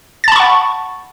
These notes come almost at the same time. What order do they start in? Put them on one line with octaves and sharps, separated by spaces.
A6 A5 B5 C#6 F#5